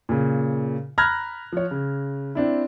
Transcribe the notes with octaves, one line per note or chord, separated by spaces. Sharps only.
A#2 C#3
A#5 B5 F6 F#6 G#6 A#6
F3 C#5
C#3
C4 D4 E4